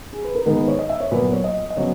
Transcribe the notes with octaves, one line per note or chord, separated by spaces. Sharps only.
G#4
B4
A#4
G#2 D#3 G#3 B3 A#4
B4
C#5
D#5
E5
C#5
A#2 F#3 B3 B4
C#5
D#5
D#5
C#3 F#3 B3 C#5